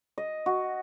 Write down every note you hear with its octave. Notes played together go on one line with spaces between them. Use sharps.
D#5
F#4